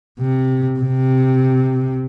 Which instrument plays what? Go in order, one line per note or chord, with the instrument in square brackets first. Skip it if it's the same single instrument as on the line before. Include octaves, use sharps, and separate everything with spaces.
[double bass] C3
C3